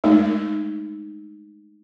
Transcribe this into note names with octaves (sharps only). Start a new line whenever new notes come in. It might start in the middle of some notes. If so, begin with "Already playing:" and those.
G#3 A3 D#4